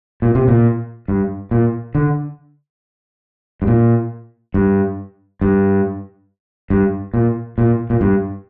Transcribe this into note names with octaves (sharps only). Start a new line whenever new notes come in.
A#2
C3
A#2
G2
A#2
D3
G2
A#2
G2
G2
G2
A#2
A#2
A#2
G2